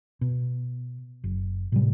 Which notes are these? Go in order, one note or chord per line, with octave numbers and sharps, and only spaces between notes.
B2
F#1
A2 C3 G3